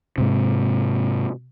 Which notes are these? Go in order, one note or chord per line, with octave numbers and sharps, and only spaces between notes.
G#2 C3